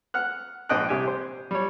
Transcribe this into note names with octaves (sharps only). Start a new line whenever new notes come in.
F#5 F6 F#6
A#1 G#2 D4 D#5 G5 F#6
C2 G4 G5 G#5
C5
G3 C#5